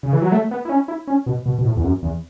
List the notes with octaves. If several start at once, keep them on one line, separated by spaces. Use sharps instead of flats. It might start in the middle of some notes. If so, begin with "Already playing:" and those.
C#3
E3
F#3
A3
B3
E4
C#4
E4
C#4
B2
B2
B2
A2
E2
F#2
E2